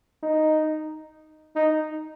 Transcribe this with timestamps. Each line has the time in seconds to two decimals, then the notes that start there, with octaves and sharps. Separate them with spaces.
0.23 D#4
1.56 D#4